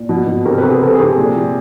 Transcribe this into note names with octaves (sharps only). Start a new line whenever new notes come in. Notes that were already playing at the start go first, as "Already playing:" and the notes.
Already playing: A#2
B2
B2
C3 A#4
B4
C3
G#4
C3 A4
G#4
C3
A#2
A#2